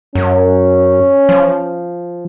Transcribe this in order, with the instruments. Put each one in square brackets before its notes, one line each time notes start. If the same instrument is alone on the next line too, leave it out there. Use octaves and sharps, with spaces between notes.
[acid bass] F#2 [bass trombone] C#4
[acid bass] F3